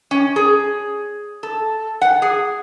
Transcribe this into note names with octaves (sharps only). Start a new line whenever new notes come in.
C#4
G#4
A4
F#5
G#4